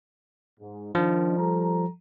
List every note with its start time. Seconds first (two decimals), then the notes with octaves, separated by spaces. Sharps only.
0.60 G#2
0.95 D#3 F3 D4
1.38 G3 A4 A#5